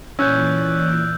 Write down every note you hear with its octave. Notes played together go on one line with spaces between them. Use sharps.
A#2 E3 C#4 D5 E6 F#6 G6